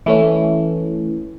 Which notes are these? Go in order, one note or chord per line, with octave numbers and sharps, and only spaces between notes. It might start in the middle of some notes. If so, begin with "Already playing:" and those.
E3 A3 C#4